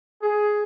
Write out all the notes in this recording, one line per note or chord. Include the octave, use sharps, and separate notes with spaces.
G#4